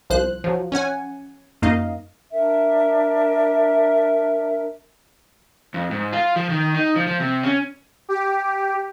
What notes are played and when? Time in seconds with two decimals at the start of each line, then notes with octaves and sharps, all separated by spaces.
0.10 C2 F3 C5 F#6
0.44 F3 F#3
0.72 C#4 C#5 F#5 G#5
1.62 F#2 A#3 D#4 D#5 F5
2.32 D4 A#4 E5
5.74 F2
5.91 G#2
6.13 F4
6.36 F3
6.50 D#3
6.75 D#4
6.96 F3
7.07 F3
7.20 C3
7.43 C#4
8.09 G4